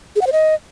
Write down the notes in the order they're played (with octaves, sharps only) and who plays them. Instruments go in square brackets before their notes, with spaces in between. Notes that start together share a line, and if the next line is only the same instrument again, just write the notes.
[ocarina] G#4
F#5
C5
D#5